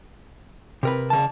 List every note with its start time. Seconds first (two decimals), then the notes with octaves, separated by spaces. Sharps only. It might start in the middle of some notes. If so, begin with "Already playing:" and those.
0.83 C3 A#4 B4
1.10 C#3 A5